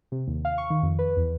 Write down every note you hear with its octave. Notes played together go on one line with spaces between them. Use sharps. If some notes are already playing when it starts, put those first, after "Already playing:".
C3
D#2
F5
C#6
D#3
F2
B4
E2